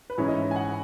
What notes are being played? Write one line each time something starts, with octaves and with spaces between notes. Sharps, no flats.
B4
G#2 E3 G#3 C#4 E4 C#5
D#5
E5
G#5
F#5